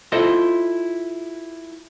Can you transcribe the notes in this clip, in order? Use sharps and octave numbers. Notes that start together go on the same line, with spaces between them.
E4 F4 A4 C5 D#5 E5